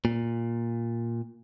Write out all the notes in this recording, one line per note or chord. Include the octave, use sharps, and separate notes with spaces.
A#2